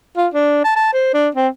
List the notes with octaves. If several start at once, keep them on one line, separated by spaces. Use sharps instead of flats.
F4
D4
A5
A5
C5
D4
C4